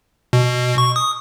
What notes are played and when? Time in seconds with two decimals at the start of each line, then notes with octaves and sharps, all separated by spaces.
0.33 B2
0.78 C#6
0.96 D#6